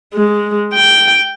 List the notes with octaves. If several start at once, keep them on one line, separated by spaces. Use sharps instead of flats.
G#3
G5